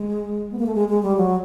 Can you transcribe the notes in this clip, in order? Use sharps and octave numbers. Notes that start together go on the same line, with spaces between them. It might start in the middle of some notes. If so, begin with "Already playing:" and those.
Already playing: G#3
B3
A#3
A3
G#3
G#3
G3
F#3